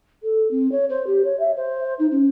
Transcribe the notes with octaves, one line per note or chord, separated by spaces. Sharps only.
A4
C4
C#5
C5
G4
C#5
E5
C5
D#4
C#4